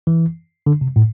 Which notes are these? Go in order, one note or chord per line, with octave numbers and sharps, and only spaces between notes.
E3
D3
C3
A2